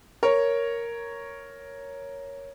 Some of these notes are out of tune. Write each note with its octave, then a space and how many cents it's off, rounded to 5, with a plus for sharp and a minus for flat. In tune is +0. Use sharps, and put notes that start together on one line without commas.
A#4 +0 C#5 +0